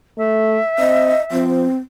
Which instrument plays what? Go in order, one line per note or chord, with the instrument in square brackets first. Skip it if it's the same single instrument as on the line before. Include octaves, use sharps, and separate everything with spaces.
[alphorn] A3 [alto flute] E5
[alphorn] C4 [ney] D#5
[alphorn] F3 [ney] C4